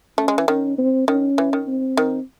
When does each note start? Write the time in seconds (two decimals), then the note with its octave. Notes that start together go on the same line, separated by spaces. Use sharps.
0.18 A3 C#4
0.28 G#3
0.38 E3
0.48 D#3 C#4
0.78 C4
1.08 D#3 C#4
1.38 E3
1.53 D#3
1.68 C4
1.97 D#3